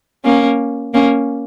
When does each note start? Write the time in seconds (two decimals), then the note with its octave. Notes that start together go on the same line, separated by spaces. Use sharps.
0.24 A#3 C#4
0.94 A#3 C#4